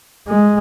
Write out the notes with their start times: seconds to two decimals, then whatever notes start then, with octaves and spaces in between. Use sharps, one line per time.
0.28 G#3